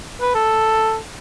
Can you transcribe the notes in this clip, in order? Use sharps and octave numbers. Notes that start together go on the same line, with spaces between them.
B4
A4